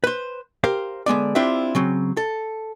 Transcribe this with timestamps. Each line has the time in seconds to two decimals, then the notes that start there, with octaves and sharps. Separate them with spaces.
0.04 B4 C5
0.64 G4 A#4 C5 F5
1.06 D3 G#3 B3 D5
1.35 C4 D4 E4 F4 G4 E5
1.75 C#3 F#3 C4
2.17 A4